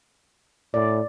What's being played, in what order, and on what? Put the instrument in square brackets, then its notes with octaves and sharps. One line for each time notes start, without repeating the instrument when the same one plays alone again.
[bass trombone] A2 [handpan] D5